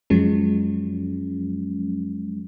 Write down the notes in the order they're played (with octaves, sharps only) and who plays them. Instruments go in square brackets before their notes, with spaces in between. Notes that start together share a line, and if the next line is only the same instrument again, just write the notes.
[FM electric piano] F#2 F3 F#3 G#3 C#4